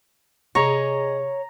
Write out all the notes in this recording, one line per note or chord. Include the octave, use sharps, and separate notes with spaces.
C3 G#4 C#5 D#5 A#5